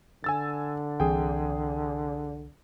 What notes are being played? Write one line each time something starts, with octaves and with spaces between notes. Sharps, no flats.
D3 G#5 E6 A6
C2 E3 C4 G#4 G5